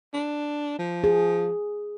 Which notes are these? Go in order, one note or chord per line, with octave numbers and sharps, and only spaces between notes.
D4
F3
G#4